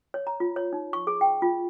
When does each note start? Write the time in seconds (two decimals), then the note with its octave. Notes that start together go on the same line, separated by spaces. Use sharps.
0.14 C#5
0.27 A#5
0.40 F4
0.56 C#5
0.73 D#4
0.93 C#6
1.07 G#4
1.21 G5
1.42 F4